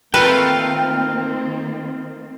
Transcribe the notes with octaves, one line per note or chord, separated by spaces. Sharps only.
D#3 A3 A#3 C4 F4 A#4 B4 G5